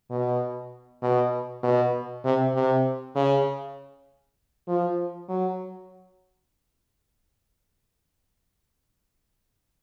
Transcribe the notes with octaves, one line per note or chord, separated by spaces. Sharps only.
B2
B2
B2
C3
C3
C#3
F3
F#3